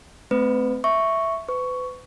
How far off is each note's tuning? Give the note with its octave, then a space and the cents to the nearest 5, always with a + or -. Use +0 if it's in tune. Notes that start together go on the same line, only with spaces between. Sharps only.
A3 -5 C4 -25 B4 +30
E5 +0 C#6 +0
B4 +35 C#6 +10